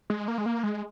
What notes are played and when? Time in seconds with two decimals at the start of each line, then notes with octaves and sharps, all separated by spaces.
0.10 G#3
0.28 A#3
0.38 G#3
0.46 A#3
0.63 G#3